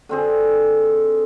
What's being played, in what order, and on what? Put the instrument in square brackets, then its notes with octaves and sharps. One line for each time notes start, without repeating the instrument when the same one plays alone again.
[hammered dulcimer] D3 C4 G#4